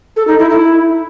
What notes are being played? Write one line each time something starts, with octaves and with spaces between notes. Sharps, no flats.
A4
D#4
E4
E4